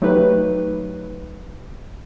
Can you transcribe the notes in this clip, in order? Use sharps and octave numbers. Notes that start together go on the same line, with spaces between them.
F#3 A3 D#4 G4 B4